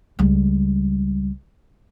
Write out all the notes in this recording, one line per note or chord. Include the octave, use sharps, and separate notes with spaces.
C#2 G3